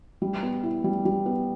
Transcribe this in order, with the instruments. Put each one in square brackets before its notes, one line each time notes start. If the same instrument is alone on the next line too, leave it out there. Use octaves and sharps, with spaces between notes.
[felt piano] G3
B3
E4
G3
G3
B3